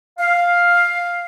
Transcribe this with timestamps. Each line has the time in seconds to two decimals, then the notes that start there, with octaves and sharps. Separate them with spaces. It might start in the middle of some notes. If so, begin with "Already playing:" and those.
0.19 F5